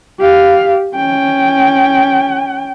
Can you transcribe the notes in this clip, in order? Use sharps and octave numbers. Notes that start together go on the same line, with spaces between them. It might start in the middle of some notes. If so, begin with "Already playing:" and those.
G4 F5
C#4 G5